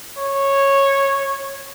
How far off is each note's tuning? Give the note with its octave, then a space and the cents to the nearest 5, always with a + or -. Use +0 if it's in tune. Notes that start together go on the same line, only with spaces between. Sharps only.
C#5 -10